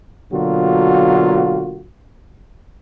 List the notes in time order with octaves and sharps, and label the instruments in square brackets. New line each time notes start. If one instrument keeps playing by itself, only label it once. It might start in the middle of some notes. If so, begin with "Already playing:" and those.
[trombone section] B2 D3 F#3 A#3 F4 F#4